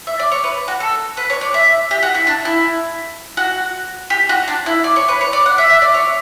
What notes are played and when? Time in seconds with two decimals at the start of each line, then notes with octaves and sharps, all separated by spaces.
0.07 E5
0.19 D5
0.32 C#5
0.44 B4
0.68 F#4
0.80 A4
1.17 B4
1.30 C#5
1.41 D5
1.54 E5
1.91 G4
2.03 F#4
2.15 E4
2.27 D4
2.45 E4
3.37 F#4
4.10 G4
4.29 F#4
4.48 D4
4.66 E4
4.84 D5
4.96 C#5
5.08 B4
5.21 C#5
5.33 D5
5.46 F#5
5.58 E5
5.70 E5
5.82 D5
5.94 C#5